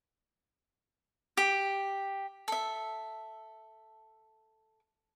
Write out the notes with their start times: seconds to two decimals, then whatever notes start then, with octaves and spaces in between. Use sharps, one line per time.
1.37 G4
2.48 A4 E5